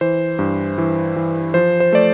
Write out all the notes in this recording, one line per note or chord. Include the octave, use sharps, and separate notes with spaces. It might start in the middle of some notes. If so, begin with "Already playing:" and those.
E3 C5
G2
E3
E3
F3 C5
C5
A3 D5